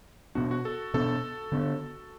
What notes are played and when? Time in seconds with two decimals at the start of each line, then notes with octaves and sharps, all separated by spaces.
0.35 B2 B3 D4 F#4
0.51 F#4
0.65 A4
0.94 B2 B3 D4 A4
1.52 D3 B3 D4